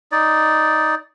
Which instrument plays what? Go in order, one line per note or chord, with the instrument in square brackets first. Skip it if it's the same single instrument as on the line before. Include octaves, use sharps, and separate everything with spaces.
[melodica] D#4 D5